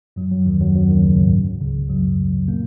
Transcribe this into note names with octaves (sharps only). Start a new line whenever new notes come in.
F#2 F#3
F#2 F#3
D#2 D#3
F#2 F#3
F#2 F#3
D#2 D#3
C#2 C#3
G#2
C#2 C#3
F#2 F#3
A#2 A#3